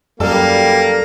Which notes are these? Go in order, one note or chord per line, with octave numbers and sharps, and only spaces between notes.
F#2 G3 A#3 A4